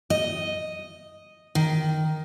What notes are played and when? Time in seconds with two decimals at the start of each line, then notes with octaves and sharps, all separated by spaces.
0.10 D#5
1.55 D#3